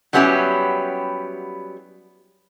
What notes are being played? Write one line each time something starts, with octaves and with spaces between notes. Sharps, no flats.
F#3 G3 B3 C#4 E4 G4